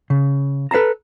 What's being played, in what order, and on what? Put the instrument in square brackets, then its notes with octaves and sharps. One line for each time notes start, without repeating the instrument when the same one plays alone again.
[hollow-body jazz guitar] C#3
A4 B4 F5 A5 A#5